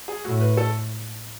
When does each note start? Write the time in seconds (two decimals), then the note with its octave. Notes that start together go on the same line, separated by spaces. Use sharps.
0.08 G#4
0.25 A2 F#4
0.41 B4
0.57 A4